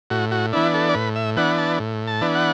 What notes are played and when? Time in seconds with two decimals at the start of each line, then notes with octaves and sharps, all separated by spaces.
0.10 A2 F#4
0.31 F#4
0.53 E3 B3 D4 E4
0.74 A4
0.89 D5
0.94 A2 B4
1.16 E5
1.37 E3 B3 D4 F#5
1.58 A5
1.79 A2
2.07 A5
2.21 E3 B3 D4
2.35 F#5